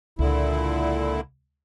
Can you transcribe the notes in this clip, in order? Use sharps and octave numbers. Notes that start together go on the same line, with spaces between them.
C#2 A#2 D3 E4